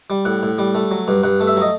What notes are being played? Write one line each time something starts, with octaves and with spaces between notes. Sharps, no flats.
G3
A2 F#5
A2
G3
A3
F#3
G2
G2 F#5
A3
E5
F#3 D#5